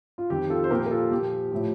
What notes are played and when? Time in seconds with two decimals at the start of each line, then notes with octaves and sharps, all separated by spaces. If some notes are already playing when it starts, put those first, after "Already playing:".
0.18 F4
0.30 F2 D#3 G4
0.50 F4 A4
0.64 C5
0.70 A#2 F3 G4 A#4
0.86 A#4
0.91 F4 A4
1.11 A#2 F3 G4
1.51 A2 F3